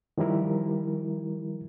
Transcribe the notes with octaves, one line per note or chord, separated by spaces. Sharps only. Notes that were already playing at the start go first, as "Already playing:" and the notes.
D#3 F3 G3 E4 A#4